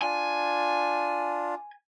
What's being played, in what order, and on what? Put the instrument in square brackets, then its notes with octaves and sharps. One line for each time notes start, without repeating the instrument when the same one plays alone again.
[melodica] D4 F4 [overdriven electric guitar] G#5